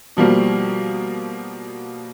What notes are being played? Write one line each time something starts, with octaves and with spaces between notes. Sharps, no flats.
B2 F3 G3 A#3